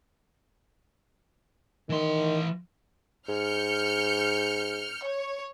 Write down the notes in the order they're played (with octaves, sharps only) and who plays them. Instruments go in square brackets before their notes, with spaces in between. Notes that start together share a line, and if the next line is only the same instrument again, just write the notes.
[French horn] D#3 [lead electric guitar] E3 C6
[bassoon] G#2 [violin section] F6 G6 C#7
[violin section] C#5